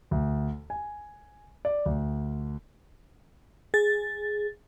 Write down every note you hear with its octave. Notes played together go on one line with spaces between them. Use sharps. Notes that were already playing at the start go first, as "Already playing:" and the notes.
D2
G#5
D5
D2
G#4 A6